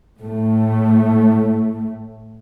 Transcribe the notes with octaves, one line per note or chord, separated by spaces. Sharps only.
A2 A3